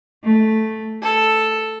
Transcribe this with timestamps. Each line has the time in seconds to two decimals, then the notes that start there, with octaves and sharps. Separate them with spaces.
0.24 A3
1.04 A4